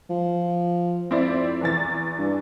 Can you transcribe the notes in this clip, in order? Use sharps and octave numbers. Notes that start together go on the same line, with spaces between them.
F3
F2 C4 E4 D5
E2 E3 A6
G2